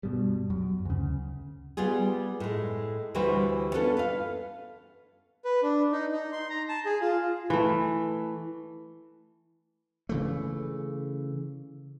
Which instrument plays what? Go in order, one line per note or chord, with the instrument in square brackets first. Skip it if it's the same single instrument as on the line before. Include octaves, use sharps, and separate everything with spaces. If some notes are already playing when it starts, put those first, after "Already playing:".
[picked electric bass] G2 B2 G3
F#2
D2 C#3
[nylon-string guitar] G3 B3 F4 G#4
A2 G#3
D2 E3 G3 F#4 B4 C5
B3 C#4 D4 F4 A4
B4 F5
[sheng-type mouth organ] B4
D4
D#4
D#4
C6
A#5
A5
G#4
F4
[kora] E3 A3
[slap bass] C#3 E3 A3